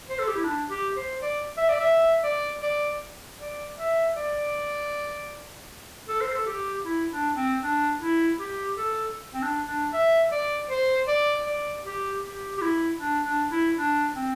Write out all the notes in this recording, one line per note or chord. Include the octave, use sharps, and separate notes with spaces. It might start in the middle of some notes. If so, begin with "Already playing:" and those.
C5
A4
G4
E4
D4
G4
C5
D5
E5
D5
E5
D5
D5
D5
E5
D5
A4
C5
A4
G4
E4
D4
C4
D4
E4
G4
A4
C4
D4
D4
E5
D5
C5
D5
D5
G4
G4
G4
E4
D4
D4
E4
D4
C4